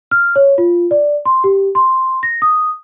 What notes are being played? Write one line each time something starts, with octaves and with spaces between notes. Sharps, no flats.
F6
C#5
F4
D5
C6
G4
C6
A#6
D#6